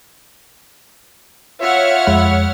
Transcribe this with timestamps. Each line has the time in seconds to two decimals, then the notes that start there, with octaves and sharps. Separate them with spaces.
1.61 F4 C#5 E5 F#5 F6
2.07 F2 G#3 B5